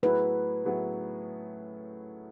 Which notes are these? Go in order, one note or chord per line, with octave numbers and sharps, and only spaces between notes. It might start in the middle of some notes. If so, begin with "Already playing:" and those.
A2 F#3 B3 E4 G#4 B4
A2 F#3 B3 E4 G#4